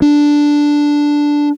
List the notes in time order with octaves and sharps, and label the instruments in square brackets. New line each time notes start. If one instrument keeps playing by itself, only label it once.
[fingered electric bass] D4